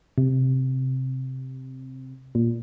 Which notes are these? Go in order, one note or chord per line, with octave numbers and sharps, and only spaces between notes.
C3
A#2